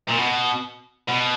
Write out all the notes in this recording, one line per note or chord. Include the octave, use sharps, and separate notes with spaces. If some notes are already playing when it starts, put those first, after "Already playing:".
A#2
B2
B2